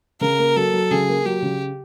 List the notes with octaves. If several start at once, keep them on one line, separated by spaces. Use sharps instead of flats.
C#3 A#4
A#3
F#3 A4
F#3
C#3 G#4
A#3
F#3 G4
C#3